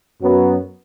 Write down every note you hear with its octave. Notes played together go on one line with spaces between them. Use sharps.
F#2 F#3 B3